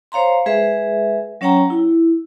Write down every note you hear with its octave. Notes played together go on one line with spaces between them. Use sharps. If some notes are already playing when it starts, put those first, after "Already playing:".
C5 C#5 F5 A#5 C6
G#3 G#4 B4 E5
F#3 C#4 C#5 F#5 G5 A#5
E4